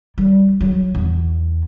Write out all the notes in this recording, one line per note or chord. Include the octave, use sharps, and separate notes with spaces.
G3
F#3
E2